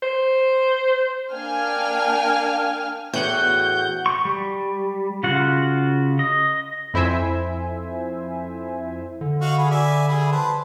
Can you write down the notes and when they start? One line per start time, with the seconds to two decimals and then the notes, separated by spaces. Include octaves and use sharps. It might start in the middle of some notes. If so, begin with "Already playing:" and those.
0.03 C5
1.32 A#3 D4 F5 G5 G#5 F6
3.13 E2 A2 F#4 F#5 G6
4.06 C#6
4.25 G3
5.23 C#3 F4 F#4 F#5
6.19 D#5
6.94 F2 E4 C5 E5 G#5
9.21 D3
9.41 F#4 D#5 F5
9.58 G#4 B5
9.70 D5 E5 G#5
10.08 G3 E4 G#4
10.32 B4 C5 A5